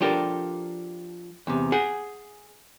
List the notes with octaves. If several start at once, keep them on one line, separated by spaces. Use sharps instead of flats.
F3 D4 G4 A4 A#4
E2 C3
G#4 F#5